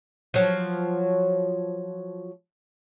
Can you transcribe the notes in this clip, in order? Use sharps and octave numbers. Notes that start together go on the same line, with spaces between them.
F3 F#3